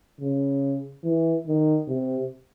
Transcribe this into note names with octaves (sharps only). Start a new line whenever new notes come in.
C#3
E3
D#3
C3